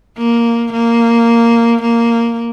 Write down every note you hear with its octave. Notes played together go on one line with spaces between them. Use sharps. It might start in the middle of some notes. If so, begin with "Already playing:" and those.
A#3
A#3
A#3